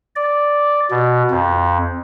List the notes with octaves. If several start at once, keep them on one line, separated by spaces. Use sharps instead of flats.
D5
B2
F2